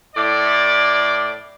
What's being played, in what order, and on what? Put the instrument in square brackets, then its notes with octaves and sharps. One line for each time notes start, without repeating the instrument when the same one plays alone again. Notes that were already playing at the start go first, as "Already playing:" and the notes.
[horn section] A2 D5